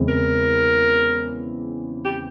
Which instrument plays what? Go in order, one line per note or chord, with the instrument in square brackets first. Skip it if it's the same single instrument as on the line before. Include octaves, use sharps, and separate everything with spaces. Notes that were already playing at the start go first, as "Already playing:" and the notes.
Already playing: [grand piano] E2 C#3 E3 G#3 C4
[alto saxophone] A#4
G4